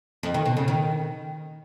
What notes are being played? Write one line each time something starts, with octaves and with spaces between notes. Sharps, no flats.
F2
D#3
B2
C#3
D#3